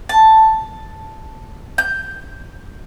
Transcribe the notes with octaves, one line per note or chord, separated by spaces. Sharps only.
A5
G6